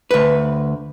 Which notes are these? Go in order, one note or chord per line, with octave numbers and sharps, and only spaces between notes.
D2 B4